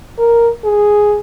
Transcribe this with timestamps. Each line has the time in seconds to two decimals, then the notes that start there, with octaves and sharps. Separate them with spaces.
0.18 A#4
0.65 G#4